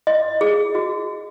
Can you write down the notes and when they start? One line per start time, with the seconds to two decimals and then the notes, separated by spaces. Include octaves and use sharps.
0.07 D#5
0.41 G#4
0.75 F#4